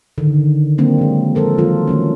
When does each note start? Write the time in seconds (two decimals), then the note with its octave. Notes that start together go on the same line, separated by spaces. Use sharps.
0.18 D3 D#3
0.78 F#3 A#3 C4 D4
0.98 F3 G#3
1.35 F3 A4 A#4 C5
1.58 D#3 F#3 F4
1.87 D#3 A3 C#4